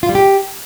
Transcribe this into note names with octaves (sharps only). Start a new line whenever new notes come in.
F4
G3
G4